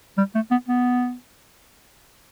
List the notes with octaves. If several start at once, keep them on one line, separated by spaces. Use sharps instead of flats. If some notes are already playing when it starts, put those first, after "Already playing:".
G3
A3
B3
B3